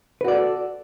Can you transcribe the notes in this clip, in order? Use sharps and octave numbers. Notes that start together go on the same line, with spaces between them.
F#4 A4 B4 D5